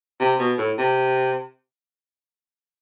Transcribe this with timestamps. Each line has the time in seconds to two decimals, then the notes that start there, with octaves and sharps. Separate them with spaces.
0.21 C3
0.39 B2
0.58 A2
0.78 C3